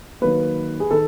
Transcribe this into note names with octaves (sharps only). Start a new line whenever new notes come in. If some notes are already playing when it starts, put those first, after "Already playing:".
D#3 F#3 A#3 B4
G#4
D#3 A4